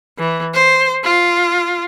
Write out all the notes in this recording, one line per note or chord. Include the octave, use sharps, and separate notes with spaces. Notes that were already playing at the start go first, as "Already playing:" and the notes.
E3
C5
F4